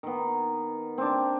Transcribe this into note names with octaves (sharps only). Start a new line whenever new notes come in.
D#3 B3
C4 D4